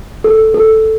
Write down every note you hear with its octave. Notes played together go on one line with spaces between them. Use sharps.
A4
A4